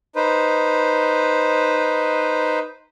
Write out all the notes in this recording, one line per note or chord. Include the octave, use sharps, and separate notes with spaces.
D#4 B4 C5